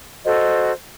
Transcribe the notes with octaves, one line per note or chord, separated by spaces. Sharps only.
F#4 A4 C5 D#5